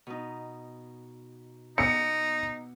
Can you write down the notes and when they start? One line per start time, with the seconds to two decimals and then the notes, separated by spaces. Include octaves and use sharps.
0.07 B2 D#4
1.78 B3 D#4 C#7